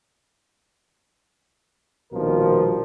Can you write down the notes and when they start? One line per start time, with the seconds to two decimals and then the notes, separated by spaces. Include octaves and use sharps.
2.13 A#1 B2 D#3 F3 G3 A#4